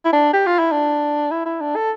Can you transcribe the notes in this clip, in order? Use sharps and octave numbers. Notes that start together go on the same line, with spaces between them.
E4
D4
G4
F4
E4
D4
E4
E4
D4
A4